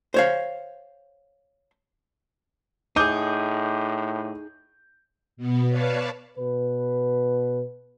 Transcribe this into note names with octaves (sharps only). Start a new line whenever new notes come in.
C5 C#5 F5
A2 D#4 G#4 D6 D#6 G6
B2 B3
B4 C#5 D5 F5 A5
B2 B4